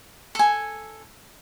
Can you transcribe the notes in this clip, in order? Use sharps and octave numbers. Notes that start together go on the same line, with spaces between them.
A4 G#5